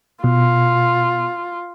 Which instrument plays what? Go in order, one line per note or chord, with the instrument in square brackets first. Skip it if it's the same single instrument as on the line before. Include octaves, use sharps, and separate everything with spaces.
[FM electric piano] B2 [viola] F4